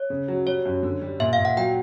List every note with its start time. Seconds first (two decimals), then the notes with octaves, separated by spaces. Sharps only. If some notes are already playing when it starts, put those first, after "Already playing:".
Already playing: C#5
0.10 C#3
0.28 F#3
0.47 G3 C#5
0.65 F#2
0.83 D3
1.01 G3
1.20 A#2 E5
1.33 F5
1.39 A#2
1.45 F#5
1.57 F#3 G5